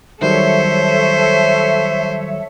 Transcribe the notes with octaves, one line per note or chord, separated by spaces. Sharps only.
D#3 F#3 G3 A4 C5 C#5 E5